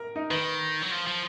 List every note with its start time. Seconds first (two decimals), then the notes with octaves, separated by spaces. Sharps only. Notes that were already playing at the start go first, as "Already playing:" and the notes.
Already playing: A#4 A#5
0.16 D#4 D#5
0.30 D#3 B4
0.82 F#3
0.92 F3
1.07 F3